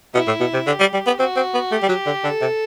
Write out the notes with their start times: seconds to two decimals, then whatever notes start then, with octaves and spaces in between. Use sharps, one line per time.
0.14 B2 E4
0.27 A2
0.40 B2
0.54 C3
0.67 D3 G4
0.80 G3
0.93 G3
1.07 B3
1.19 C4 F#4
1.36 C4
1.54 B3
1.71 A3 G4
1.82 G3
1.89 F#3
2.06 D3
2.24 D3 A4
2.41 C3